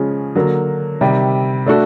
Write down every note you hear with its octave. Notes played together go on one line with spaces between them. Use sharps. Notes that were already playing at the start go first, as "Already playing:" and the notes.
Already playing: C#3 F3 G#3 C#4
D3 F#3 A#3
C3 D#3 G3
A3 D4 F#4 A4